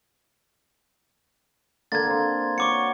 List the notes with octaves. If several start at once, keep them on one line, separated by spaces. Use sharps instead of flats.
D3 A#3 G#6 A6
C4 C6
F#4 C#5 C#6 D6 C#7